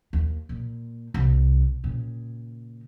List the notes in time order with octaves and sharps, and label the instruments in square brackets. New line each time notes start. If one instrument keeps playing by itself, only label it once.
[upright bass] D#2
A#2
C2
A#2 C#3